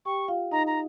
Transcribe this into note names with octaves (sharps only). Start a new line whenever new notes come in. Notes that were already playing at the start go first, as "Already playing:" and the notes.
G4 G5 C#6
F4 F5
D#4 D#5 A#5
A#5